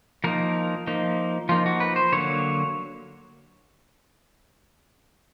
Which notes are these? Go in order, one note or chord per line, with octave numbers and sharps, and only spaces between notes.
F3 A#3 D#4 A#4
F3 A#3 D#4
F3 A#3 D#4 F4
F#4
B4
C5
D3 F#3 A#3 C#5